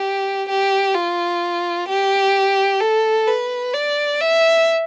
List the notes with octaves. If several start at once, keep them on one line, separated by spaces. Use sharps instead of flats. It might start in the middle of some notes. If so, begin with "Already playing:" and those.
Already playing: G4
G4
F4
G4
A4
B4
D5
E5